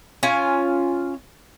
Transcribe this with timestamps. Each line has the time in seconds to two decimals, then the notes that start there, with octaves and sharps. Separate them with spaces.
0.23 C#4 F4 G#5